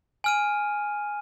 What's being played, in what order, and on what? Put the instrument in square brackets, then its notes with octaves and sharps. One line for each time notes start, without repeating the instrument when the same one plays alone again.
[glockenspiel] G#5 F6 D#7